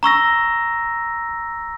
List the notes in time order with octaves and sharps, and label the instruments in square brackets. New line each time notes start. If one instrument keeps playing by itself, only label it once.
[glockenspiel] A#5 C#6 E6 A#6